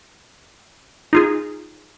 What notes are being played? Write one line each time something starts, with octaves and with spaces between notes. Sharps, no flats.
D#4 F4 G#4